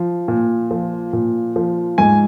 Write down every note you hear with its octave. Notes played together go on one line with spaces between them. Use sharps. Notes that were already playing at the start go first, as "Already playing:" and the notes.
Already playing: F3
A#2
F3
A#2
F3
G#2 G#5